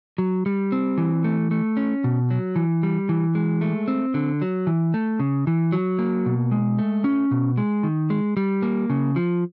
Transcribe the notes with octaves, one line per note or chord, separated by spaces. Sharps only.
F#3
G3
C4
E3
A3
A3
C#4
B2
F#3
E3
G3
E3
G#3
A3
C4
D3
F#3
E3
A3
C#3
E3
F#3
A#3
B2
G#3
A3
C#4
B2
G#3
D#3
G#3
G3
A#3
C#3
F3